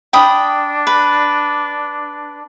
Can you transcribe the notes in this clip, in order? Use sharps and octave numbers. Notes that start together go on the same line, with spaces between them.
D4 G5 B5 D#6
B4